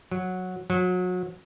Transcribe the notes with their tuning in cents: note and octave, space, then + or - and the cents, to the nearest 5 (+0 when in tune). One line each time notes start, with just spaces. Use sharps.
F#3 -10
F#3 -30